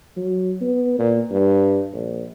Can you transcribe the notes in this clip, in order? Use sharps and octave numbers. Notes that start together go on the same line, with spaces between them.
F#3
B3
A#2
G2
A#1